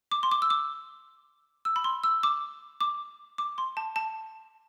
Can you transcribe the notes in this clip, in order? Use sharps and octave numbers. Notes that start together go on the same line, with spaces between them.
D6
C6
D6
E6
D6
E6
B5
C6
E6
D6
D6
D6
C6
A5
A5